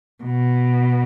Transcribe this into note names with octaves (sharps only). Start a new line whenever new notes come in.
B2